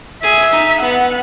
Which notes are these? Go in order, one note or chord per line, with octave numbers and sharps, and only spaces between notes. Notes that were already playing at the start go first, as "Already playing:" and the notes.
G#4 E5
D#4
B3 F#5